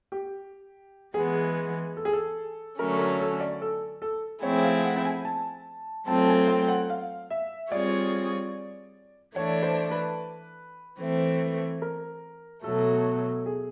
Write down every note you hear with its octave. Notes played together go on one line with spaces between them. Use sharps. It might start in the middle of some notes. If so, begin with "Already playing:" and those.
G4
E3 G#3 B3 G#4
A4
G#4
A4
D3 F#3 A3 C#4 A#4
A#4
A4
D5
A4
A4
F3 A3 C4 E4 G#4 C#5
F5
F#5
G#5
A5
F#3 A3 C4 F4 A4 A5
G#5
G5
F#5
F5
E5
G3 C4 F4 G#4 C#5 D5
E3 A3 D4 C#5
C5
B4
E3 A3 C4
A#4
B2 F#3 A3 A4
G#4